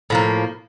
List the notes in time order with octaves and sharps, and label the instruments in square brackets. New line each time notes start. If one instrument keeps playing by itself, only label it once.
[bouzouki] A2 F3 A#3